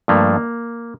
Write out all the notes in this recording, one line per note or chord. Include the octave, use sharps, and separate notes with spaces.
G2 F3 A3 A#3